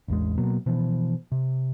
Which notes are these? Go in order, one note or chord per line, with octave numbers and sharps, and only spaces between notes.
A1 E2 G#3
B2 F#3 A#3
B2 E3 F3
C3